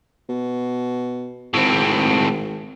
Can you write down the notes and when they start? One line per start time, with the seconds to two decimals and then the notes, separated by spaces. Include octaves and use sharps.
0.29 B2
1.54 G#1 A2 C4